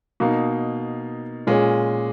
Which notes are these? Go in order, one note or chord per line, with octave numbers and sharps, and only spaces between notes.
B2 A#3 D#4
A#2 G#3 C#4